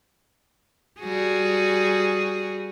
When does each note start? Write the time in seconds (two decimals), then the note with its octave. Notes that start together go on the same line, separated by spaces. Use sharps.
1.01 G3 F#4 G#4